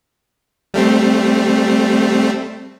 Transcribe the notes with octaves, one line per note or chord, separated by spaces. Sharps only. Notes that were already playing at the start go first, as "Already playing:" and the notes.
G3 A3 C4